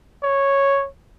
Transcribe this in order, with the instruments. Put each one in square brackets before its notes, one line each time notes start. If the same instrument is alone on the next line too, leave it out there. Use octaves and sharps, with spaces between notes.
[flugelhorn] C#5